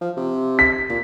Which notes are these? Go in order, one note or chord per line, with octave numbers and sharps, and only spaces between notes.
F3
C3
B6
A#2